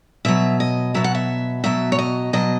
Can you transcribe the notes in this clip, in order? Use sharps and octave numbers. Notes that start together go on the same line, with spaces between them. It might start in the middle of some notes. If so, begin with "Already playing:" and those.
B2 F#3 E5
D#5
B2 F#3 E5
F#5
E5
B2 F#3 E5
C#5
D#5
B2 F#3 D#5